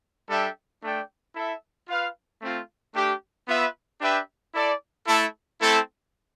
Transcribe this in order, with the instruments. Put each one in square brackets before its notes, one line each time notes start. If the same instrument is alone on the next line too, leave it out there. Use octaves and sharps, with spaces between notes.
[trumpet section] G3 D4 A4 E5 G5
A3 D4 A4 D5 G5
E4 A4 E5
F4 B4 F5
A3 C4 F4
A3 D4 G4
B3 F4 B4 E5
D4 G4 B4 E5 G5
E4 A4 D5
A3 E4 A4
A3 C4 E4 A4